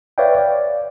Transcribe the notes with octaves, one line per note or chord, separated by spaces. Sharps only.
B4 C#5 D5 E5 F5 G5
D5